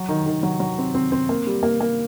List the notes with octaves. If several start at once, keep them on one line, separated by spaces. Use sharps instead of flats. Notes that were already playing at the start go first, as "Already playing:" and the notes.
Already playing: F#3
D#3
D#3
F#3
F#3
C4
C4
C4
A#3
G3
A#3
A#3